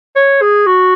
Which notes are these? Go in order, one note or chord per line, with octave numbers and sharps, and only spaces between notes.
C#5
G#4
F#4